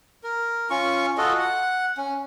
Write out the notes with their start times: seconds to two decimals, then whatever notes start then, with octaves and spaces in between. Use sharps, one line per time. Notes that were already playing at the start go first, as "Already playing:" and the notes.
0.24 A#4
0.70 C#4 F4 C#6
1.18 F4 F#4 A4 D#5
1.39 F#5
1.97 C#4